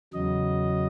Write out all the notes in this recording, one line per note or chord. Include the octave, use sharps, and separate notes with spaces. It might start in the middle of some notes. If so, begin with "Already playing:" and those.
E2 C#3 F#3 D#5